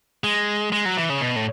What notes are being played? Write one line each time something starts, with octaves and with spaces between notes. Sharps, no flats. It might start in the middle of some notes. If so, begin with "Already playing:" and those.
G#3
G#3
F#3
E3
C#3
B2
A2